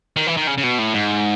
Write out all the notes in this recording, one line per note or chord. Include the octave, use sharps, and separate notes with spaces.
D#3
E3
D#3
C#3
C#3
B2
A2
G#2